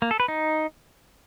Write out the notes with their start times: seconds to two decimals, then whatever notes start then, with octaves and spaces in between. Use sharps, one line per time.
0.02 A#3
0.11 A4
0.20 B4
0.28 D#4